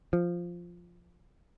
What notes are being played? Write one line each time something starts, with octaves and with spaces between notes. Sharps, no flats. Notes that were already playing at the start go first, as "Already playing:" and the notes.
F3